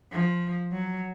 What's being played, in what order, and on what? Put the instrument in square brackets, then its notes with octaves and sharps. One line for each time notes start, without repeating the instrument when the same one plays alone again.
[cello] F3
F#3